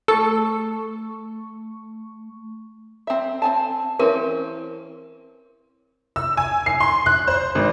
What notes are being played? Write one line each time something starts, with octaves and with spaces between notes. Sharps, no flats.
A3 A4 C#6
C4 E5
C4 G#5 A5
E3 C4 C#4 A#4
E6
G#5
C7
C6
F#6
C5
G#1